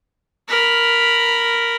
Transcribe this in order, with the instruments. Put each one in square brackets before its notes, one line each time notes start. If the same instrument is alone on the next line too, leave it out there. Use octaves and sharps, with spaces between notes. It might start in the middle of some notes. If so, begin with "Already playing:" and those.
[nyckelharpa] A#4 B5